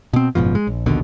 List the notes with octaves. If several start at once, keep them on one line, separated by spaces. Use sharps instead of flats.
B2 C4
F#1 G#2 B2 F3
G#3
A#1
A#1 D#2 B2 D3